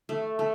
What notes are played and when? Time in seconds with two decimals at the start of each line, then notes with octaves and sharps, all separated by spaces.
0.09 A3
0.39 A3